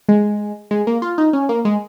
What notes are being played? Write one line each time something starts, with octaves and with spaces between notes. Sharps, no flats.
G#3
G#3
A#3
F4
D#4
C#4
A#3
G#3